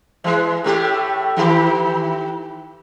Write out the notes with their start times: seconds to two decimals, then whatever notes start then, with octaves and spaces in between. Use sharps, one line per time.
0.24 E3 G#3
0.64 A2 A3 G4
1.37 D#3 E3 G4